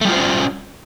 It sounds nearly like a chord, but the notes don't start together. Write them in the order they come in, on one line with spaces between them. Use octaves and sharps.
A3 G3 F4 C5 C#4